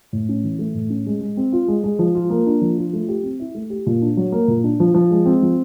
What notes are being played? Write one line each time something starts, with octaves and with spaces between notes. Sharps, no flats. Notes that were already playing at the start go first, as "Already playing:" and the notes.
A2
C#4
E3
A3
A2
C#4
G#3
G#3
C4
F4
G#3
G#3
F3
F4
A#3
D4
F3
F4
A3
G4
C4
E4
A3
G4
A#2
D4
F#3
A#3
A#2
D4
F3
F3
G#3
C4
F3